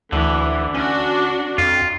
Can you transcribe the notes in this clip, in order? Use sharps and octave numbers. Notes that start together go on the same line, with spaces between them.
D2 D3 E3
C#4 D4 F#4
F2 F4